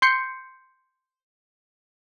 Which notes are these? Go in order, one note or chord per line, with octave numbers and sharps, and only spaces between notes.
C6 G6 C7 C#7